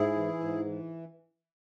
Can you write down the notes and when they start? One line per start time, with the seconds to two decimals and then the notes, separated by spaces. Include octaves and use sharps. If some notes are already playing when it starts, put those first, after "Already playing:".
Already playing: G#2 E4 G#4
0.16 E3
0.40 G#2
0.66 E3